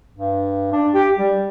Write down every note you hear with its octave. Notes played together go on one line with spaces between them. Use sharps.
G2
D4
G4
G3